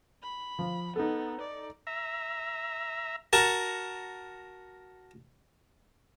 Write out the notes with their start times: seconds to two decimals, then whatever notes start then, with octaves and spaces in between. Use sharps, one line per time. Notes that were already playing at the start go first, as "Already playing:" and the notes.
0.23 B5
0.59 F3
0.96 B3 D#4 A4
1.41 D5
1.87 E5 A#5
3.33 F#4 A#4 A5